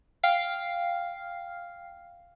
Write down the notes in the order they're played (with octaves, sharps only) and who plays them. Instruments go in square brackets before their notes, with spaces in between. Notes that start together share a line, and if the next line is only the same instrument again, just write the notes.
[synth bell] F5 G5 F6 C7